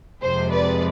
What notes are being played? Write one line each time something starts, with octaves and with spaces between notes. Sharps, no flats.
F2 C3 F3 G#3 C5
B4 D5